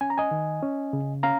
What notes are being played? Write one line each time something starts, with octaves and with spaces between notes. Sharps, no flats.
C#4 G#5
A#5
D#5 G#5
D#3
C#4
C#3
C#4 F5 A#5